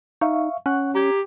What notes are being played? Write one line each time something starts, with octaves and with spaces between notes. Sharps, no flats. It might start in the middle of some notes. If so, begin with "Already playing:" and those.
D#4 E5 F5 C#6
C#4 F#5 C#6 F#6
G4 A#5 G#6